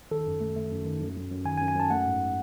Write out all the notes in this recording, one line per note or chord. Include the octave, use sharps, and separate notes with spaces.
D#3 A4
F#2
A3
A3
F#2
D#3
F#2
F#2
F#2
D#3 G#5
G#5
F#2
G#5
F#2 A5
A3 F#5
G#2